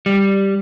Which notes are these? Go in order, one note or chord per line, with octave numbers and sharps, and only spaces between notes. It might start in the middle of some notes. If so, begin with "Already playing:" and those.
G3